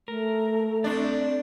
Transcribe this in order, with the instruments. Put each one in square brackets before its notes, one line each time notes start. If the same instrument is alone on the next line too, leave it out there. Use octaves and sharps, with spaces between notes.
[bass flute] A3 [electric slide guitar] A#4
[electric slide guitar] C4 D5 [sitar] D4